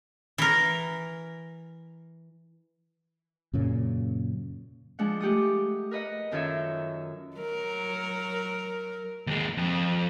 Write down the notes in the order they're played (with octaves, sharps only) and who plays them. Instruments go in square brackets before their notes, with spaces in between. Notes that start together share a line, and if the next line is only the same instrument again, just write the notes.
[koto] E3 A#4
[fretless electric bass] F#2 A#2 C#3
[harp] F3 G#3 D4 F#5
A3 G4 F#5 D#6
A#4 B4 D#5 F#5
F#2 D#3 F4 A4 C#5 E5
[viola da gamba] F#3 A#4
[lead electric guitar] D#2 G#3
F2